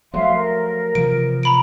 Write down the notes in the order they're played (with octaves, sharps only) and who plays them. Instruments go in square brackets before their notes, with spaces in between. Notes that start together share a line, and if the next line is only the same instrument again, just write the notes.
[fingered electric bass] F3 F#3 A3 [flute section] E5 F5 C6
[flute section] A#4
[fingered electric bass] C3 E3 F3 [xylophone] D7
[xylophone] A#5 B5 D7